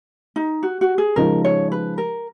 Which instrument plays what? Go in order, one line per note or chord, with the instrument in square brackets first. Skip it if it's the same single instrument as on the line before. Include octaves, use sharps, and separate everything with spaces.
[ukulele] D#4
F#4
F#4
G#4
[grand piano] C#3 F3 G#3 D#4 [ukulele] A#4
[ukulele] C#5
B4
A#4